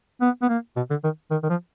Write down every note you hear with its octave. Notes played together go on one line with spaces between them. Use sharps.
B3
B3
A#3
B2
D3
D#3
D#3
D#3
F3